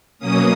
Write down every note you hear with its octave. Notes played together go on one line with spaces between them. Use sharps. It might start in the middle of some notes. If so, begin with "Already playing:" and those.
B2 F#3 A#3 C#4 D#6